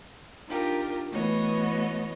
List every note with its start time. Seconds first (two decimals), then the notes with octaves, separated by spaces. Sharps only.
0.47 D4 D#4 F4 G4 A#4
1.11 E3 A3 B3 F#4 C#5 D#5